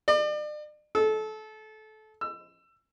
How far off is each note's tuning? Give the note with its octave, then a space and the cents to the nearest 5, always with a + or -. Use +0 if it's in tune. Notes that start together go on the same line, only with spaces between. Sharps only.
D5 +40
A4 -25
E6 +25